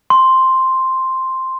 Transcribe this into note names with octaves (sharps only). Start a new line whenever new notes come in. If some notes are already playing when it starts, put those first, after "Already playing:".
C6